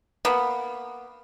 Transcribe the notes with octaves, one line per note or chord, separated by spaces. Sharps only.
A#3 B3